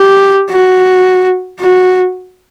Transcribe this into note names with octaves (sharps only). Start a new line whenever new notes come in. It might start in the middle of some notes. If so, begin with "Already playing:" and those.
Already playing: G4
F#4
F#4